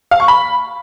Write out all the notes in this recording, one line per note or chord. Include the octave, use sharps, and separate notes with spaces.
F5
C#6
B5